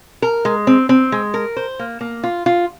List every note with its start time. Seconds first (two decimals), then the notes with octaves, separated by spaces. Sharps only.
0.22 A#4
0.45 G#3
0.67 C4
0.89 C4
1.12 G#3
1.34 A#4
1.57 C5
1.79 A#3
2.01 A#3
2.24 F4
2.46 F4